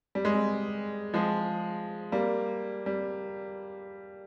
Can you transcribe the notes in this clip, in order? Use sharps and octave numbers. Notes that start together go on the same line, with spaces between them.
G3
G#3
G3
F3 G#3
G3 A#3
G3